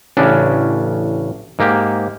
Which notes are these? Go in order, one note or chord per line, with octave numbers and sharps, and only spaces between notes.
A1 C#3 C#4 D4
G#2 A#3 G4